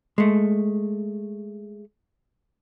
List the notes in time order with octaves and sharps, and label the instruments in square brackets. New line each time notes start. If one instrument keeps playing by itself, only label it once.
[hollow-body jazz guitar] G#3 A3